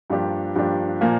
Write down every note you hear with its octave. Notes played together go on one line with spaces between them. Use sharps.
G2 F3 A#3 D4 G4
G2 F3 A#3 D4 G4
A#2 F3 A#3